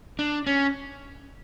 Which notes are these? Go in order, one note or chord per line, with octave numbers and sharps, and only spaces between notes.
D4
C#4